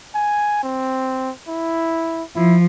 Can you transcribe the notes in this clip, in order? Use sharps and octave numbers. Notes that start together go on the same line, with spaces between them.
G#5
C4
E4
F3 E4